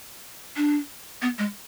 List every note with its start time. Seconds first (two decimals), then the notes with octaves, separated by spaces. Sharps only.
0.57 D4
1.22 B3
1.38 G#3